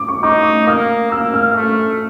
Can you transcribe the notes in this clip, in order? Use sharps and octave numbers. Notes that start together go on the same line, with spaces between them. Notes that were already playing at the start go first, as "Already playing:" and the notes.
Already playing: D6
C#6
D#4 D6
A#3 D#6
A#3 E6
F6
A3